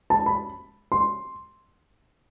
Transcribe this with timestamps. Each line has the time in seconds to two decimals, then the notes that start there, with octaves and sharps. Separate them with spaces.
0.10 A5
0.26 B5
0.92 C6